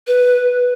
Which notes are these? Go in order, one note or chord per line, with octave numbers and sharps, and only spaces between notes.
B4